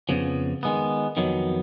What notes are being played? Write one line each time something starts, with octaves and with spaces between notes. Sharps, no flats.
F2 C#3 F3 B3
D#3 G#3 B3
F2 D#3 F#3 B3